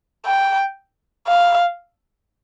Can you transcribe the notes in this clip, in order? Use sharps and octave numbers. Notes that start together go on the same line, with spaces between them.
G5
F5